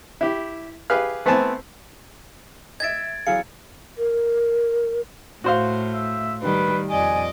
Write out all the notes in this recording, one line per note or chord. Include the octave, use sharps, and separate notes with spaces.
E4 G4
G4 G#4 B4 F5 F6
A3 B3 C4 G#5 A5
D#5 E5 G#6 A6 D7
E3 F#3 G#4 F5 C#7
A#4
A2 F#4 C5 F5
E5
D#3 G3 B4
F2 D5 D#5 G#5